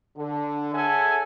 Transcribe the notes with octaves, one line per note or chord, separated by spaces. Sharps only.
D3
G#4 A4 C#5 E5 F#5 G#5